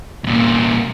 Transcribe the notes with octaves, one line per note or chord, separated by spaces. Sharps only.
E2 A#2